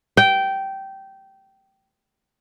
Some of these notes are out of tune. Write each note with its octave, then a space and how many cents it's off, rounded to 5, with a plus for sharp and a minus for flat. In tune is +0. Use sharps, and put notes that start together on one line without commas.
G5 -15